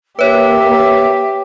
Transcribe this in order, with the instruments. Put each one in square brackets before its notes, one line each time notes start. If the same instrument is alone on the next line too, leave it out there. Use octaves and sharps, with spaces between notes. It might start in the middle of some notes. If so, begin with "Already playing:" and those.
[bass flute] A#3 [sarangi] G4 [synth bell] B4 C#5 [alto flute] E5